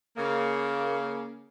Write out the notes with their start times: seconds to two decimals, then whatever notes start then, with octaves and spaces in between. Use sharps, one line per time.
0.17 C#3 A#3